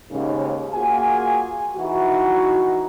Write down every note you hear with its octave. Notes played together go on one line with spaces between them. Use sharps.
D#2 G#2 C#3
A#3 F4 F#4 G#4 G#5
E3 D#4 E4 F#4